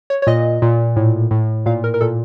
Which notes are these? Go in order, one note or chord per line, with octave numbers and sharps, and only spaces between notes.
C#5
C#5
A#2 D#5
A#2
A2
A2
A#2 F5
A#4
A#4
A#2 A4